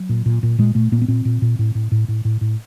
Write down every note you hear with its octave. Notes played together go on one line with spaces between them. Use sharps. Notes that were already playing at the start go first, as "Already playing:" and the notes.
Already playing: F#3
A#2
A#2
A#2
A#2 G#3
A#2 A3
A#2 A#3
B3
A#2 C4
A#2
A#2
A2
A2
A2
A2
A2
A2